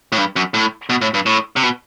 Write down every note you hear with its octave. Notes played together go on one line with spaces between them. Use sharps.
A2
G2
F#2
A2
B2
A2
G2
A2
C3
B2